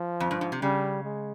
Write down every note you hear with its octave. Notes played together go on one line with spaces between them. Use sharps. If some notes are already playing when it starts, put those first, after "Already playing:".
Already playing: F3
F2
G2
G#2
C3
C#3 G3
G#3